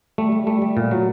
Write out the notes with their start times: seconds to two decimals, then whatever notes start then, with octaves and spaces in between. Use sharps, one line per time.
0.18 G3 A3
0.32 G3
0.47 G3 A3
0.62 G3
0.77 A#2
0.91 F#3